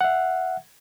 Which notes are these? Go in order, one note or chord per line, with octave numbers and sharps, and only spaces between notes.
E5 F#5